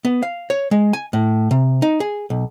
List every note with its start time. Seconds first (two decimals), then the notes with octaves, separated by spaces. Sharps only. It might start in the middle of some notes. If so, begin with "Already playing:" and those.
0.05 B3
0.23 F5
0.50 C#5
0.71 G#3
0.93 G#5
1.13 A2
1.51 C3
1.82 D#4
2.00 G#4
2.30 B1